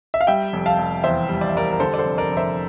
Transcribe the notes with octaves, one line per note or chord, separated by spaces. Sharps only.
E5
F5
G3 E5 G5
F1
F5 A5
F1
E2 C5 E5
G3
D5
E5
G3 A#4 D5
A#4
D3 A4 C5
D5
A4 C5
F1
A#4 D5
F1
C5 E5